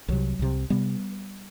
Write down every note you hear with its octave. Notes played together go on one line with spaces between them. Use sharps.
C2 C3 D#3 F#3
C2 C3
C3 G3 B3